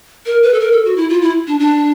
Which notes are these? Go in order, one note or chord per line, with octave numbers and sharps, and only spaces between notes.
A#4
B4
A4
A#4
A4
F#4
E4
F4
E4
D4
D4